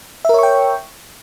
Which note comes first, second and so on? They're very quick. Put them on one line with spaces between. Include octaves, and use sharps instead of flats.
E5 A#4 C#5 C#6 G5